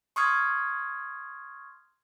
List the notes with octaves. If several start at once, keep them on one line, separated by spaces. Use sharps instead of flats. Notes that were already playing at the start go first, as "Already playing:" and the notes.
C6 C#6 D#6 F6 G#6